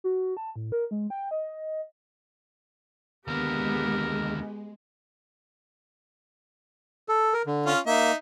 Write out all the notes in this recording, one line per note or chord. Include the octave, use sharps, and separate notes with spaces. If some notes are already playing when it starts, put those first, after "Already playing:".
F#4
A5
A2
A#4
G#3
G5
D#5
D#2 D3 G#3 B3 G4 A#4
A4
A#4
D3
C#4 F4
A#3 D#4 E5